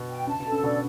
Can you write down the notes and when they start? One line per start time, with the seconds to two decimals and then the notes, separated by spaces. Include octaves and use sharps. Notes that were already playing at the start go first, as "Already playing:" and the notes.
Already playing: B2
0.09 G5
0.27 C#3 A5
0.40 B2
0.46 A4
0.52 C#3
0.63 B2 D3 D5